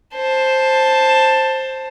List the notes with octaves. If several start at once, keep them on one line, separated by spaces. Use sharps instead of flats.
C5 A5